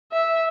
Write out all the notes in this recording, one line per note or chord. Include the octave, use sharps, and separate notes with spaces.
E5